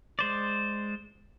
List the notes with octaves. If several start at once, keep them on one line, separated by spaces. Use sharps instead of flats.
G#3 C5 D5